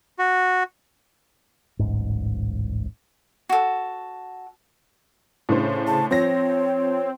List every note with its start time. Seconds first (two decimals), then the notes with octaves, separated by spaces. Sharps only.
0.19 F#4
1.79 D1 A1 G#2
3.49 F#4 A4
5.49 A2 C#3 D4 C5
5.87 A5
6.11 F3 C4 C#5 A#6